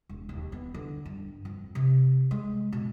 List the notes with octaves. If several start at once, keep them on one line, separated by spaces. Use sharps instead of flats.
E1
D#2
B3
D3
G2
F2
C3
G#3
B2